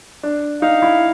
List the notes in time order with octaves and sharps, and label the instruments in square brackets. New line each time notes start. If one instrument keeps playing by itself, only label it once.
[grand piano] D4
[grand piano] D#4 [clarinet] F5
[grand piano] E4